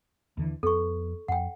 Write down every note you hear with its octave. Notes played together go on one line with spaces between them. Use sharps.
D#2 D3 E3
F2 B3 A4 C#6
F2 F#5 G5